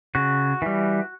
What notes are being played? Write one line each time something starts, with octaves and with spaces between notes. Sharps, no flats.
C#3 F#4
E3 G3